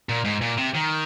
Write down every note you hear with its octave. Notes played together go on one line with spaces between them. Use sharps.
A#2
G#2
A#2
C3
D#3